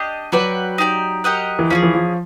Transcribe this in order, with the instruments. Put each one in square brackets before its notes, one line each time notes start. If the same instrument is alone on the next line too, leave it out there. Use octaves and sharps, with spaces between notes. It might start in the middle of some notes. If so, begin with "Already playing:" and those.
Already playing: [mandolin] D4 G4 D#5
[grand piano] F#3 [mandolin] F#4 B4 D5 G5
[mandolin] D#4 G4 B4 D5
G4 A#4 D#5 F#5
[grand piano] E3
[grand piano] F3 [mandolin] C#4 E4 G#4
[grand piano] E3
F3